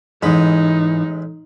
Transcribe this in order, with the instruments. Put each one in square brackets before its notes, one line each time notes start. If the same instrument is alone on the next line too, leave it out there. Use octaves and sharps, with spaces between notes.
[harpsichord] A1 G#3 B5 [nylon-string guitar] G#2 E3 [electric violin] D#4